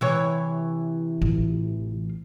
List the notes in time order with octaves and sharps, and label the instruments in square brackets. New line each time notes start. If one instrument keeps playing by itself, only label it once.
[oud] C3 E3 C#5
[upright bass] A1 F4